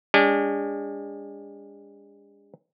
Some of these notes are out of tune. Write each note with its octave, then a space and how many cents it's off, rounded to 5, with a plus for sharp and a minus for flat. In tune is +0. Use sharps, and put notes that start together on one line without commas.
G#3 -40 D4 -30